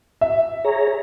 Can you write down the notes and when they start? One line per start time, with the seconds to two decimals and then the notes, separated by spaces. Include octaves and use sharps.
0.21 E5
0.64 G#4 C#5 A#5